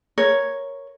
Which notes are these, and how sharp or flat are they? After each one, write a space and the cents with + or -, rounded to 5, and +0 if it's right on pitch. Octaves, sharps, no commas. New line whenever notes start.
A#4 +0 C#5 +0